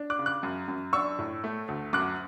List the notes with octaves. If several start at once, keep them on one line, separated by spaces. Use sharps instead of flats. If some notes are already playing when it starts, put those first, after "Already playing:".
Already playing: D4
D6 F#6
C#3
D6 F#6
F#2
F#2
D4 C#6 E6
A2
A3
D2
F#2 D6 F#6